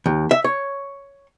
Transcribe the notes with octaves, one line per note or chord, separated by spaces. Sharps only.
D#2
E5
C#5